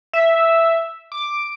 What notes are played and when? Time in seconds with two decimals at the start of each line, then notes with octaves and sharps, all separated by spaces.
0.13 E5
1.12 D6